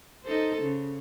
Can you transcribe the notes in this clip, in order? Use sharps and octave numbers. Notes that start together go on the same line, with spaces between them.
D#4 A4 C5
C#3